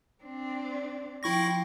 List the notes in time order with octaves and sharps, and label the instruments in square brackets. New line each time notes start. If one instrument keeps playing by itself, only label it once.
[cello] C4 D4
[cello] F3 G5 [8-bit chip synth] E4 C#6 A#6